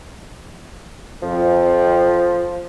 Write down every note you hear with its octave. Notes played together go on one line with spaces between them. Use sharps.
F2 F3